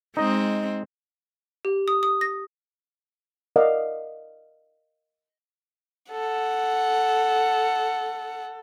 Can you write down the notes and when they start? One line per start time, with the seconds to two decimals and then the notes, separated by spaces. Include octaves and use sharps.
0.17 G#3 C4 D#4 D#5
1.65 G4
1.88 D#6
2.03 D#6
2.21 A#6
3.56 A#4 D5 D#5 F5 F#5
6.12 A4 F#5